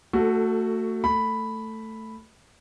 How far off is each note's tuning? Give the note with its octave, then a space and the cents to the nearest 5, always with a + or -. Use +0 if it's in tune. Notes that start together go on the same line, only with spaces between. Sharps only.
A3 +25 F#4 +0 A4 +0
A3 +10 B5 +0